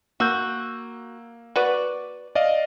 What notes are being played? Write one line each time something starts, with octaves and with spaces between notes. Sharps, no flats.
A#3 F#4 E6 G6
F#4 B4 D5
D5 D#5 F5